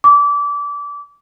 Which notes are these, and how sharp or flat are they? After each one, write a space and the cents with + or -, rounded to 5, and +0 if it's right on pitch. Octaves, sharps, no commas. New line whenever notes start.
D6 -25